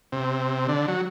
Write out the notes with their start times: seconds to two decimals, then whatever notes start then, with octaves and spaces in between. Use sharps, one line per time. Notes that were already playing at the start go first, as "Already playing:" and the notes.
0.12 C3
0.68 D3
0.88 F#3